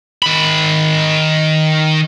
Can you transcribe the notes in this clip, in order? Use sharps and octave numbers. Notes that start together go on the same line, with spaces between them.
D#3 B5